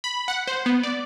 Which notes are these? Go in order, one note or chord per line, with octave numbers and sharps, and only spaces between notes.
B5
F#5
C5
B3
D5